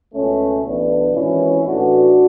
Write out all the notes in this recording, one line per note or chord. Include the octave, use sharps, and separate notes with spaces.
C#2 B2 A3 C#4
B1 A2 E3 B3 D4
G#1 G#2 E3 C#4 E4
A1 A2 E3 D4 F#4